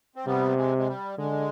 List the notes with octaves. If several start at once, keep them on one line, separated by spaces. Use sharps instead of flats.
C4
C3 G3 B3
G#3
G#3
G3
D3 G#3